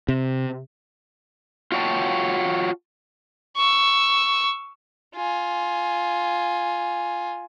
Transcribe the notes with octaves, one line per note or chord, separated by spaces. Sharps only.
C3
F4 F#4 C#5 D#5 G5 A5
C#6 E6
F4 G#5